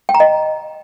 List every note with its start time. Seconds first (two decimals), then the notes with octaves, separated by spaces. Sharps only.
0.09 G5
0.14 A#5
0.20 D#5